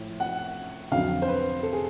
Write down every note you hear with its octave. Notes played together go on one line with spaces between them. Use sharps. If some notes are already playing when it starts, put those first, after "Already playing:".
Already playing: A2 F3
F#5
F2 D3 F#3 F5
C5
B4
A4
G#4